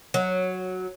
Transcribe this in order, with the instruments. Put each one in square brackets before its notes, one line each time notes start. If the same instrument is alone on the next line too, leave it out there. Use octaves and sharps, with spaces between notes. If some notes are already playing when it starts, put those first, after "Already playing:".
[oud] F#3